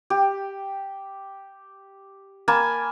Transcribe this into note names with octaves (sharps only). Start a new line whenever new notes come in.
G4
A#3 G#5 A5 B5